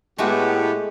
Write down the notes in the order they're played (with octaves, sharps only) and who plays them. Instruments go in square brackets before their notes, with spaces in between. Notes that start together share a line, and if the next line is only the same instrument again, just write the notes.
[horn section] A2 B3 G4 [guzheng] G#3 A3 F#4